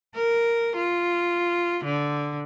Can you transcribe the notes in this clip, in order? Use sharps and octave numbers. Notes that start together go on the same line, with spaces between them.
A#4
F4
D3